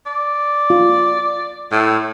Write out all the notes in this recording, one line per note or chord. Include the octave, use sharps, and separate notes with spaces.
D5
F4
A2